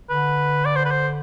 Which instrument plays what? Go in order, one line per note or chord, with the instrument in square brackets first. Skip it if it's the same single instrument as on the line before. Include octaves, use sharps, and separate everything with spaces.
[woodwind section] D3 [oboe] B4
[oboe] D5
C5
B4
C5